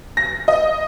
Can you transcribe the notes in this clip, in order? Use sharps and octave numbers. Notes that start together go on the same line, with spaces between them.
A#6
D#5